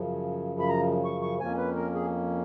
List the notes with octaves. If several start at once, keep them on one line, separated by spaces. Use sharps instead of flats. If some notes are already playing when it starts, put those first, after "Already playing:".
Already playing: F#2 C#3 F3
B5
A#5
C#6
C#6
F2 F3 A#3 C#4 G#5
B4
A#4
G#4